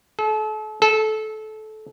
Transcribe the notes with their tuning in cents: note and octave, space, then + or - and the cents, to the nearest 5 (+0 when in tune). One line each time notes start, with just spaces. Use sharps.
A4 -35
A4 -20